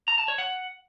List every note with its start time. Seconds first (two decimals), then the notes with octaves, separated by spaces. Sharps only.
0.08 A#5
0.18 A5
0.28 C#5
0.38 F#5